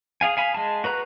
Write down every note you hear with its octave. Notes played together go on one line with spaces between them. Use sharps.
G#4 F5 G#5
F5 G#5 B5
G#3 A5
F#4 B4 A#5 F#6